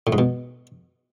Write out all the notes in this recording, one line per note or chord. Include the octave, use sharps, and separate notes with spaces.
A2
G#2
B2